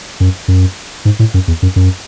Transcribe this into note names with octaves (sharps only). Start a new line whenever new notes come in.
F#2
F#2
G#2
A2
F#2
E2
F#2
F#2